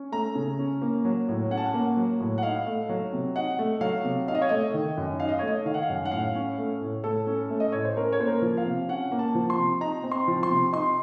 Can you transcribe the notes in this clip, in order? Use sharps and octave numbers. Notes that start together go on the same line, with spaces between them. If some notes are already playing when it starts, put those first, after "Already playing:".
Already playing: C#4
A3 A#5
C#3
C#4
A#3
F#3
A2
C#4 F#5
A5
F#5
A#3
F#3
A2
F#5
D#4 F5
A3
F#3
C3
D#4 F#5
A3
F#3 F5
C3
D#4 F5
D#5
C#5
A3 D#5
D#3
F#2
D#4 F5
D#5
A3 C#5
D#5
D#3 F5
F#5
F5
F#2
F#5
A2 F5
C#4
A3
A2
A2 A4
C#4
A3
D#5
A2 C#5
C5
C#4 A#4
C#5
A#3 C5
A#4
F3
F5
C3
C#4 F#5
A#3
A5
F3
C6
C3
D#4 A#5
C4
C6
F3
C6
C3
D#4 C6